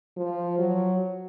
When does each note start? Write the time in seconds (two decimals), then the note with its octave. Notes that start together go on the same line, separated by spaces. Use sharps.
0.17 F3
0.59 F#3